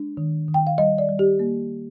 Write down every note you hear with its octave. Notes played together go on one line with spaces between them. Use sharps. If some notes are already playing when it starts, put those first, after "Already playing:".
Already playing: G#3 D4
D#3
D#3
G5
F5
G3 D#5
D5
G3
G4
A#3